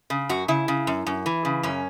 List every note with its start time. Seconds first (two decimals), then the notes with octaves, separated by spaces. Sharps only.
0.10 C#3
0.29 F#2 F#4
0.48 C#3 E4
0.68 C#3
0.87 F#2
1.07 F#2
1.26 E3
1.45 C#3
1.63 F#2 C#4